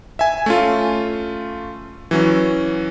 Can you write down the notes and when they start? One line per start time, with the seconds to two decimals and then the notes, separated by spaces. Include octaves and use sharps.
0.19 E5 G#5
0.46 A3 C#4 F4
2.11 E3 F#3 C#4